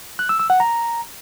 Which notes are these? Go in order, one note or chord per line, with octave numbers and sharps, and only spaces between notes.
F#6
E6
E6
F#5
A#5